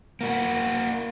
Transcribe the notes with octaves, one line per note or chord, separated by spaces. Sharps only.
A#3 F#4